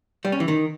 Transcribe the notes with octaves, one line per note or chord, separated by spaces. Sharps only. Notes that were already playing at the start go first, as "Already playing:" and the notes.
G3
C#4
E3
D#3